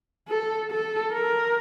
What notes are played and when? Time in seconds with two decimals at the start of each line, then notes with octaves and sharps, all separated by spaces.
0.28 A4
0.71 A4
1.13 A#4